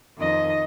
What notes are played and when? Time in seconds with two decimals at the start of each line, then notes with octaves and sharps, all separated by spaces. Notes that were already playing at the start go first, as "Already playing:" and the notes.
0.19 F2 D#3 D#5